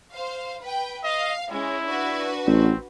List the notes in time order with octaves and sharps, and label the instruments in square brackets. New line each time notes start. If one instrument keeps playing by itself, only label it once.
[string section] C5 F5
B4 G5
[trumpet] D#5 [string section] F5
[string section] G#3 C#4 [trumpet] E4
[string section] D4 F#4 B4
[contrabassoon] A1 [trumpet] C4